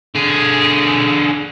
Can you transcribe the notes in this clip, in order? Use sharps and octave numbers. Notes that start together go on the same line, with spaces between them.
D3 G#4